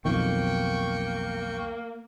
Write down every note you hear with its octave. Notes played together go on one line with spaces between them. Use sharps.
B1 F2 D#3 A#3 G5 C#6